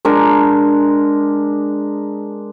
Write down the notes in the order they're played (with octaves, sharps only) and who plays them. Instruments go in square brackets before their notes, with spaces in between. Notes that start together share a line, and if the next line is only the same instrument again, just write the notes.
[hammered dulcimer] G#3 D4 A#4